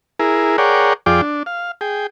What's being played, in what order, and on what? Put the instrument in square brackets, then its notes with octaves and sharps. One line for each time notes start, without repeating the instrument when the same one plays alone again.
[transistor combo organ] E4 G#4 A#4
G#4 A#4 C#5 D5 F#5 G5
F2 F4 G#4 D5 G5 D6
D4
F5
G#4 G5